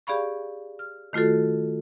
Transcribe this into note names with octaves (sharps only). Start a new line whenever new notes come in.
G4 G#4 D5 F5 B5 C#6
F6
D#3 A3 F4 F#4 A4